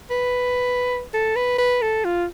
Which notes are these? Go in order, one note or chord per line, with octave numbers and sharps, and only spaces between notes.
B4
A4
B4
B4
A4
F4